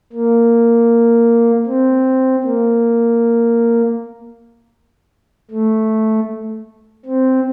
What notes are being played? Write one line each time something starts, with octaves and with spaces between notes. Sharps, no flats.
A#3
C4
A#3
A3
C4